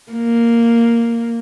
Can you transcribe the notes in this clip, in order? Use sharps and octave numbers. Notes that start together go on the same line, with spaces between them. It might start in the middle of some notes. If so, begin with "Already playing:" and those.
A#3